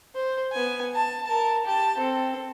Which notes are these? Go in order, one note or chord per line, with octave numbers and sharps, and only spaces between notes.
C5
B3 G#5
A5
A#4 A5
G4 A5
C4 A4